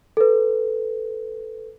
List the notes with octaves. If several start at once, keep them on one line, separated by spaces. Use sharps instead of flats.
A4 B4